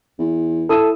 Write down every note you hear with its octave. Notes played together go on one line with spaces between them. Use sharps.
E2
E4 A4 D#6 E6